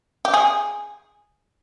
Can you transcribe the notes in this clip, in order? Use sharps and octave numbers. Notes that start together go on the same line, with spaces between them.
G4
G#4